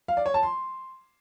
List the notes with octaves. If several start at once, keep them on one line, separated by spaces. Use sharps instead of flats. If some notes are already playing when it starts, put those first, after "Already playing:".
F5
D5
C#5
A5
C6